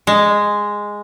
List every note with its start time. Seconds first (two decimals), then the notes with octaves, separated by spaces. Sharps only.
0.07 G#3